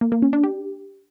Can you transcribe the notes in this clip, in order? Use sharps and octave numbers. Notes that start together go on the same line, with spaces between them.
A#3
A#3
C#4
D4
G4